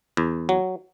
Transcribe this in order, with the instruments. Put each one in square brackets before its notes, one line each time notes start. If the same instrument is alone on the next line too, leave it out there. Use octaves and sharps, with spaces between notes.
[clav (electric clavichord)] E2
F#3